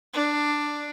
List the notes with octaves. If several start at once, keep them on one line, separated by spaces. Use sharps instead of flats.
D4